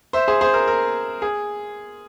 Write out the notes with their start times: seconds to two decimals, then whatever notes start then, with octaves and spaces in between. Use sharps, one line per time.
0.13 C5 E5
0.28 G#4 C5
0.41 G#4 C5
0.54 A#4
0.67 A#4
1.22 G#4